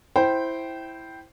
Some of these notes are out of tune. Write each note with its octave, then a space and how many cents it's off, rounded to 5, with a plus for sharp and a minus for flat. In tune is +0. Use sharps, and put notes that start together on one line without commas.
E4 +0 C5 +0 G5 -15